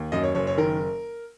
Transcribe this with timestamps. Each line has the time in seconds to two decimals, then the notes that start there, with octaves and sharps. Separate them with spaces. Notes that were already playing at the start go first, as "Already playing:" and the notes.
Already playing: D#2
0.12 F#2 D#5
0.24 C#5
0.35 F#1 C#5
0.47 C#5
0.57 D#3 A#4